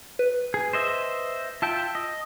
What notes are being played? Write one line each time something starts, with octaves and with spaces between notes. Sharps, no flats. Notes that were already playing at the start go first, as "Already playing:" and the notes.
B4
G#4
C5 D#5 E5
F4 E5 G5 A5
D#5